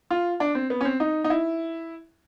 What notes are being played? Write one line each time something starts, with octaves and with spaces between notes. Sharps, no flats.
F4
D4
C4
B3
C#4
C4
D#4
D#4
E4